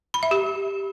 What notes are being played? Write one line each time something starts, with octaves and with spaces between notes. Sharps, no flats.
B5
E5
G4